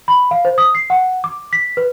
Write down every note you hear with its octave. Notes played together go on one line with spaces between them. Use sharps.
B5
F5
C5
D#6
C7
F#5
D6
B6
B4